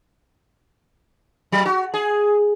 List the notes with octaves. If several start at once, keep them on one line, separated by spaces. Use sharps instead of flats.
F#3
F#4
G#4